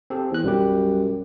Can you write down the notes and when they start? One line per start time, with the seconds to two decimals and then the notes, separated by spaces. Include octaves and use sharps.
0.10 C4 G4 A4
0.31 E2 G#4 F#6
0.44 B1 F#2 G3 G4